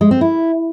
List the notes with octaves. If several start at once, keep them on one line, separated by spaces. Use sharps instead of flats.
G#3
C4
E4